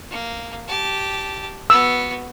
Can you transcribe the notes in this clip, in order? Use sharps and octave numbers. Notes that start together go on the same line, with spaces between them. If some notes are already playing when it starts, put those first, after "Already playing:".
A#3
G4 A5
B3 F#4 E6